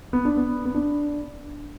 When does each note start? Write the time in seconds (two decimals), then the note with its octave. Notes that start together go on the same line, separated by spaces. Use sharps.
0.13 B3
0.25 D4
0.37 B3
0.65 B3
0.75 D4